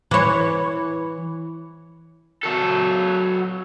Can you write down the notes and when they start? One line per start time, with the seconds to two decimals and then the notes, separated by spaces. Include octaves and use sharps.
0.11 E3 C#5
2.43 F#3 A4